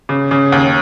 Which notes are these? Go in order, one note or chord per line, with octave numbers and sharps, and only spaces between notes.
C#3
C#3
D#2